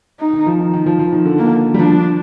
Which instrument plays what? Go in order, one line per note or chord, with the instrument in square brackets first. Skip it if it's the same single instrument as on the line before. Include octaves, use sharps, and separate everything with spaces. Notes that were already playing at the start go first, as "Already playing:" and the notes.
[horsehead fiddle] D#4
[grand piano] D#3
F3
D#3
D#3
F3
F3
D#3
D3
[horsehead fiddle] A#3
[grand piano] G3
[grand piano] F3 [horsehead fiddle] D4